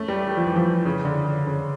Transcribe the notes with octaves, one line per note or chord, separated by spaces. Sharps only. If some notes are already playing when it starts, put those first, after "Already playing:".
Already playing: A3 C#4
G3
G3
F3
E3
F3
C#3
D3
C#3
C#3